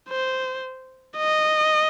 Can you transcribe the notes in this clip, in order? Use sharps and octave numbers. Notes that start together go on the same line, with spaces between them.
C5
D#5